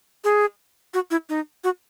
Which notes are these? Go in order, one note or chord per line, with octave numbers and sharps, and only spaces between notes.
G#4
F#4
E4
D#4
F#4